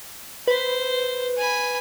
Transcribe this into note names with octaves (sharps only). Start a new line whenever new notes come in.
B4 C5
G#5 B5